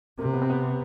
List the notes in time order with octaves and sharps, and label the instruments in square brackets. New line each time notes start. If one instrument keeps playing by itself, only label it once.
[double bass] C3 [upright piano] A#3
[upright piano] B3
C4
B3